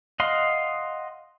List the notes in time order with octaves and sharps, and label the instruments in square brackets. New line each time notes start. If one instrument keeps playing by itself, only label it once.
[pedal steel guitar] D#5 F5 F#5 C6